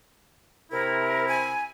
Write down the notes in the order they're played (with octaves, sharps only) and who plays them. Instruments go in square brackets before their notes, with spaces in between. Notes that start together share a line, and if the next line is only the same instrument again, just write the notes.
[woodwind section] C3 E4 [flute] A#4
[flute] G#5